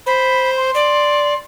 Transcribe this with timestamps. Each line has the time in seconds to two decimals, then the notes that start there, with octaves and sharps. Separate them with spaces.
0.06 C5 B5
0.57 C6
0.75 D5